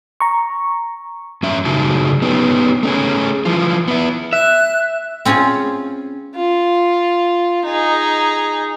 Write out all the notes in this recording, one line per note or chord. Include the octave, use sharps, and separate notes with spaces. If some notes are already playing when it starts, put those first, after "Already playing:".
A#5 C#6
F#2 C#4 E5
F#2 A2 C#3 D#4 F#4 A5
B3 C#4 D#4 G4
A3 C#4 G#4
E3 F3 F4
B3 E4
E5 F#6
C4 C#4 F4 G#4 C#5
F4
D#4 G#4